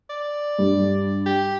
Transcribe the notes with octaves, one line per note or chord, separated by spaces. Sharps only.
D5
G2
G4